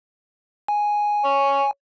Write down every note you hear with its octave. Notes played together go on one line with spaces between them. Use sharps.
G#5
C#5